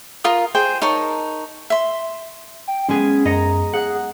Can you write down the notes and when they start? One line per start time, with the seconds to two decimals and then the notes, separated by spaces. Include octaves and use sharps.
0.24 F4 A#4 D#6
0.55 G#4 C5 G5
0.82 D#4 A#4 C#5 A5
1.70 E5 C6
2.68 G5
2.89 G#3 B3 C#4 G#4
3.25 F#2 D#5 A#5 C#7
3.73 G#4 F#5